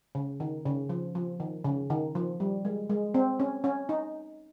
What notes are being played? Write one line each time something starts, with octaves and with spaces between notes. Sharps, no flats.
C#3
D#3
C#3
F3
F3
D#3
C#3
D#3
F3
G3
G#3
G#3
C4
C#4
C#4
D#4